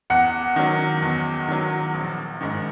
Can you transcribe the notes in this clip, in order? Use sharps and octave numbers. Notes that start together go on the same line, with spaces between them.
E2 F#5
D#3 F#3
E2
D#3 F#3
A#1
G#2 D#3